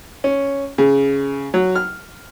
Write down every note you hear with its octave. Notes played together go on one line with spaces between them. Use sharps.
C#4
C#3
F#3
F6